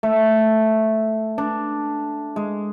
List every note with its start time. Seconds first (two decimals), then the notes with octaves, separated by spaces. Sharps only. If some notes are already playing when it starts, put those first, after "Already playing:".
0.03 A3
1.38 D4
2.36 G#3